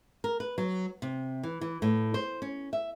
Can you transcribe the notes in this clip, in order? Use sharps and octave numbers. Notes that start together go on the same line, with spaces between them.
A#4
B4
F#3
C3
E3
E3
A2
C5
C#4
E5